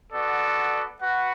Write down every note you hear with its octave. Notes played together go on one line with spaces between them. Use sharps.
B3 F#4 A4 D5
F#4 B4 F#5